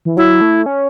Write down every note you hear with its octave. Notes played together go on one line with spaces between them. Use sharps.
E3
F#3 E4
A3
C#4